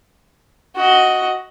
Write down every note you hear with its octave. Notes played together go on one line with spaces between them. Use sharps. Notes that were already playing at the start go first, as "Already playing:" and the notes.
F#4 D#5